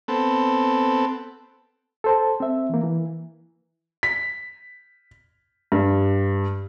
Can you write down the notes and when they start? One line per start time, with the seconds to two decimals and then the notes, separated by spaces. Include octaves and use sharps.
0.08 B3 C4 A4
2.04 A4 C5 A5
2.40 C4 E5
2.69 E3 A#3
2.83 E3
4.03 B6
5.72 G2